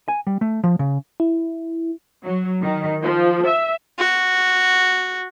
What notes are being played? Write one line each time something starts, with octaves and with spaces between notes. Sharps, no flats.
G#5
G3
A3
F3
C#3
E4
F#3
D#3
F3
E5
F#4